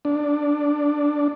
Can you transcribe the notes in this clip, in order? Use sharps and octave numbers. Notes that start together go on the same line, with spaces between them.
D4